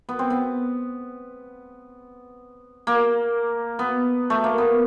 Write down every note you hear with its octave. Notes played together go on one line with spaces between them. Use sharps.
B3
C4
B3
A#3
B3
A3
A#3
B3